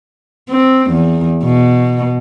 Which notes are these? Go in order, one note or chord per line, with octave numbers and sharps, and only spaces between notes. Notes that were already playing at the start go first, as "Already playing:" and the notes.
C4
E2
B2